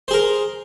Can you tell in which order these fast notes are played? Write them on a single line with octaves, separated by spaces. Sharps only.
C5 G#4 A#4